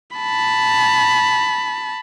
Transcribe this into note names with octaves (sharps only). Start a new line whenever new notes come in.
A5 B5